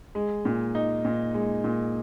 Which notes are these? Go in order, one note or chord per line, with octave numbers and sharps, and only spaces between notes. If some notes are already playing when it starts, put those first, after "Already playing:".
G#3
A#2
D#4
A#2
G#3
A#2